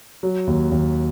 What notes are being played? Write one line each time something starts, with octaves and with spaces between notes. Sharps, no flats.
F#3
D#2
D#2